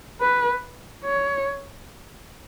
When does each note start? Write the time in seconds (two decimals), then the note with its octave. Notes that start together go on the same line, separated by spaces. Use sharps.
0.21 B4
1.05 C#5